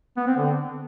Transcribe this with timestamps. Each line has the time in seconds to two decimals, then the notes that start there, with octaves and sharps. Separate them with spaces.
0.17 B3
0.27 C4
0.37 D3